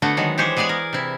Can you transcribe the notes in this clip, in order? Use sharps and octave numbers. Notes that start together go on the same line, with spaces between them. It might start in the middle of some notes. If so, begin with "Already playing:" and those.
D3 A3 B3 F#4
D#3 F#3 G#3
E3 G#3 G4 C5 C#5
G#3 B3 G#4 D5 G#5
A#4
C3 E4